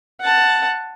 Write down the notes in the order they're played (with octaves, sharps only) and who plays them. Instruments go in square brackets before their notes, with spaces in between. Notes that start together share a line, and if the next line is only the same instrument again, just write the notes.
[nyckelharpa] F#5 A5